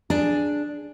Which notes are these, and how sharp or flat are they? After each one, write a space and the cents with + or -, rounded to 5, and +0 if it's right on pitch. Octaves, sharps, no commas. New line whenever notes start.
D4 +0 G#4 +0